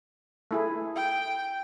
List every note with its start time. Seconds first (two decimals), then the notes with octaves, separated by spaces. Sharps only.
0.51 A3 E4 G#4
0.95 G5